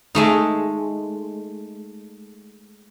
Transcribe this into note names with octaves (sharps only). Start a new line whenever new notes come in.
G#3 A3 D#4